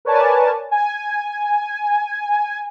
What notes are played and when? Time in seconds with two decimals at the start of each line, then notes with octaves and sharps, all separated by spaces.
0.05 A#4 B4 C#5 D5 G#5 A5
0.71 G#5